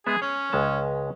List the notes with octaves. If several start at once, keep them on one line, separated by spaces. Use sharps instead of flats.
G#3 B3 G#4 E5
C#4 C#5
C#2 G#3 A5